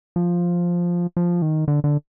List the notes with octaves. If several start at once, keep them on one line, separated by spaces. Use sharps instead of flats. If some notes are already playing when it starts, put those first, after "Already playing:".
F3
F3
D#3
D3
D3